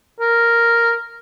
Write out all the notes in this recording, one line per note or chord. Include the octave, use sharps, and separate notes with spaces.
A#4